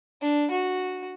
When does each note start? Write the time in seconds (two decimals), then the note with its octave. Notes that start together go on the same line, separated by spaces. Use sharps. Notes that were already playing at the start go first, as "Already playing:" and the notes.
0.21 D4
0.51 F#4